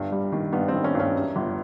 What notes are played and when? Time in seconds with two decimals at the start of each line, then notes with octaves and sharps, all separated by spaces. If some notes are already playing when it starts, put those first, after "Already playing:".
Already playing: G1 G2
0.12 G3
0.32 D#3
0.53 G2 B3
0.68 C4
0.74 D#3
0.84 C#4
0.95 G2 C#4
1.15 F#2
1.36 G1